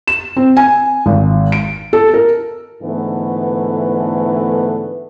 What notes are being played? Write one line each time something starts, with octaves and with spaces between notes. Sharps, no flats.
E7
C4
G#5
G#1
D7
A4
A#4
G#2 D3 E3 A3 B3